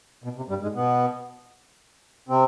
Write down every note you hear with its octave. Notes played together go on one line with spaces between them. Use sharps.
B2
C3
G2 G3
G#2 G#3
B2 B3
C3 C4